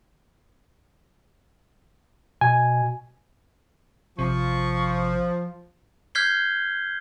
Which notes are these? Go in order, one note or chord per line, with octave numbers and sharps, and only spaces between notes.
B2 G#5
A1 C3 F3 C#6
F6 G6 G#6 B6 C7 G7